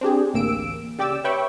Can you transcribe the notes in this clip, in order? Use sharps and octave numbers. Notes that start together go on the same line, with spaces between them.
C4 D4 G4 G#4
A1 D2 A#3 E6 D7
C#3 G4 D5 G5 D6 E6
B4 C#5 E5 G5 B5 C#6